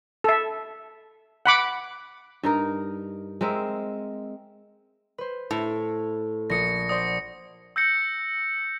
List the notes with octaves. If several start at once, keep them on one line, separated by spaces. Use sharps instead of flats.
A4 E5
F#5 B5 D6
G2 D#4 A#4
G#3 C4 A#4 E5
B4 C5
A2
A#1 D#6 A#6 C#7
C5 D5 F#5 D#6
E6 G6 A#6 C#7